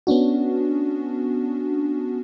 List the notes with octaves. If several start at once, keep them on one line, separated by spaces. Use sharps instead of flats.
B3 C#4 D4 F#4